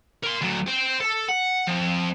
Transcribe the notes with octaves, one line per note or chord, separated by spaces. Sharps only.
A#4 C6
D2 F#3
C5 G5
A4
F#5
F3 C4